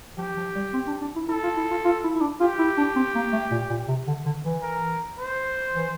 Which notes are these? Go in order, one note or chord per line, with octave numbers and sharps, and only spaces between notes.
F3 G4
F3
G3
C4
D4
D4
E4
E4 A4
F4
E4
F4
F4
E4
E4
D4
F4 G4
E4
D4
C4
A#3
A3
A#2
A#2
C3
D3
D3
E3
A#4
C5
E3